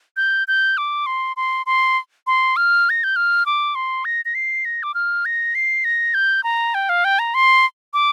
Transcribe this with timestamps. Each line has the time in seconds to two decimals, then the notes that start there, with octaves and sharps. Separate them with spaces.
0.17 G6
0.48 G6
0.78 D6
1.06 C6
1.37 C6
1.66 C6
2.27 C6
2.56 F6
2.90 A#6
3.04 G6
3.16 F6
3.46 D6
3.75 C6
4.05 A#6
4.25 A#6
4.35 C7
4.65 A#6
4.83 D6
4.94 F6
5.25 A#6
5.55 C7
5.84 A#6
6.14 G6
6.44 A#5
6.74 G5
6.89 F5
7.05 G5
7.19 A#5
7.34 C6
7.94 D6